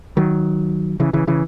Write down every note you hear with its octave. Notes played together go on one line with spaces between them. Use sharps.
D#3 F#3
C#3 E3
C#3 E3
C#3 E3